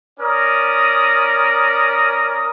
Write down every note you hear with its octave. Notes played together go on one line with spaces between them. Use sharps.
C#4 A#4 D5 D#6